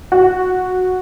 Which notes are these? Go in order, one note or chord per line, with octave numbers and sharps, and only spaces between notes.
F#4